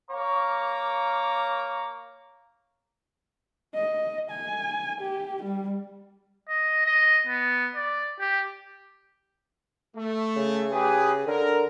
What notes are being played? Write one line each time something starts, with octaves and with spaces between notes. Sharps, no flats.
A#3 C#5 F5 A#5 D6
D#5
G#5
G4
G3
D#5
D#5
B3
D5
G4
A3
C#3
G4 G#4 B4
D3 A#4